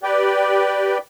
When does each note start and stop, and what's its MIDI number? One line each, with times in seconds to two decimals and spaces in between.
0.03 0.98 67
0.03 0.98 71
0.03 0.98 74
0.03 0.98 79